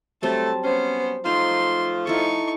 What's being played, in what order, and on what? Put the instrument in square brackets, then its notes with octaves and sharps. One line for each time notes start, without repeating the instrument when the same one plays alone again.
[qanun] F#3 G3 C4 [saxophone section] A3 [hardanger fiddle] A5
[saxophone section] B3 C#4 [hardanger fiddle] C5
[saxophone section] F3 A3 F4 [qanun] D#4 C5 [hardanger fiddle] C6
[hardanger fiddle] D#4 C#6 [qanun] E4 A4